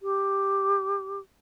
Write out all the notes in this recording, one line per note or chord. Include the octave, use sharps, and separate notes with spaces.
G4